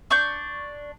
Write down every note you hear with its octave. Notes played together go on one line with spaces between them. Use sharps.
D4 C#6 G6